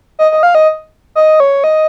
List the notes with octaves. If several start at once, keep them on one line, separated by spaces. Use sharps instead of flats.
D#5
D#5
F5
D#5
D#5
C#5
D#5